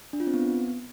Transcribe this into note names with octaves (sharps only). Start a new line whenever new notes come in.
D4
F4
C4
B3